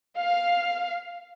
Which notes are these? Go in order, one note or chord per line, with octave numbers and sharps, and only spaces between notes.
F5